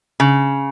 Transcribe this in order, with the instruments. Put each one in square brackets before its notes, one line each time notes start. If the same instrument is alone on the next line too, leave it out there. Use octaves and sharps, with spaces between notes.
[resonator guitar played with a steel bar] C#3